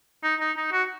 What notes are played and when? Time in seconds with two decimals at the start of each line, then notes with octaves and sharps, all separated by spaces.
0.23 D#4
0.40 D#4
0.57 D#4
0.72 F#4